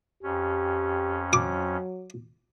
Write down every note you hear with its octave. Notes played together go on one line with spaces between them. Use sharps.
F2 C#4 G4
F#3 D6